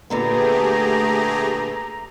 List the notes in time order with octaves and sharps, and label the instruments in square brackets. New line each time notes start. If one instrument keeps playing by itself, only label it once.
[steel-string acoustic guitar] A#2 D3 B3 [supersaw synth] A3 G4 G#4 [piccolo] A#5